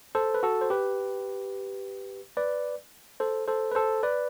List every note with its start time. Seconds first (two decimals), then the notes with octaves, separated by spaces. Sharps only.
0.15 A4 C5
0.34 B4
0.43 F#4 A4
0.61 C5
0.70 G4 B4
2.37 B4 D5
3.20 A4 C5
3.48 A4 C5
3.72 B4
3.75 A4 C5
4.03 B4 D5